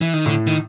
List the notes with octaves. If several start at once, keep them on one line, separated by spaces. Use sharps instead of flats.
E3
D#3
A2 D3
D#3